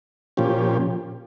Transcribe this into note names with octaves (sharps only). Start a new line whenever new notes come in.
A#2 F3 C#4 G4